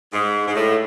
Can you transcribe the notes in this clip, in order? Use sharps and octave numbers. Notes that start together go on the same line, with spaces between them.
G#2
G#2
A2